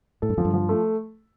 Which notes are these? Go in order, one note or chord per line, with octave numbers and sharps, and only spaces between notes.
A2 A4
G2
F2 F3
G2
F3
A3